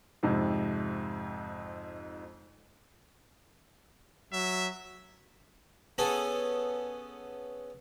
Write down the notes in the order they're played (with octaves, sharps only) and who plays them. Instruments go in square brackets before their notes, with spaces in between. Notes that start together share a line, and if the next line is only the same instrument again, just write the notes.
[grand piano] F2 G#2 C3
[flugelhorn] F#3 [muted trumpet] E5
[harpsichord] B3 C#4 G#4 A4